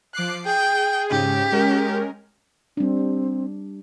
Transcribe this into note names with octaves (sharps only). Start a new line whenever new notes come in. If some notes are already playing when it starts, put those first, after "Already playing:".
F3 D6 F#6 C7
G#4 G5
G#2 C#3 G4
G#3 C#4 A#4
G3 C4 D4